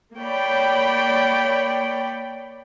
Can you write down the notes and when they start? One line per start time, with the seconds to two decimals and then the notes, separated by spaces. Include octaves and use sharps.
0.17 A#3 C#5 D5 G5 B5